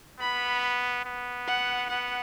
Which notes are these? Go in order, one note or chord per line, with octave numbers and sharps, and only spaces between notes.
B3 B5
B3
F#5
B3 F#5